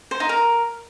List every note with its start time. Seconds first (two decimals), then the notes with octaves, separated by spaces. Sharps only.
0.11 C5
0.20 D#4
0.29 A#4